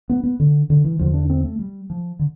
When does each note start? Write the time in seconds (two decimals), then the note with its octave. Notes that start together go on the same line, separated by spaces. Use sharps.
0.09 B3
0.23 B3
0.40 D3
0.70 D3
0.84 E3
0.99 E2 D3 F3
1.14 D4
1.30 C4
1.44 A3
1.59 G3
1.90 F3
2.19 D3